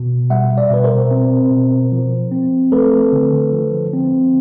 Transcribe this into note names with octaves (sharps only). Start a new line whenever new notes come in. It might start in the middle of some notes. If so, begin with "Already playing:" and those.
Already playing: B2
G3 E5 F#5
D5 E5
B2 B4
A#4 C5
C4
B2
F3
C4
A3 A4 B4
D3
F3
C4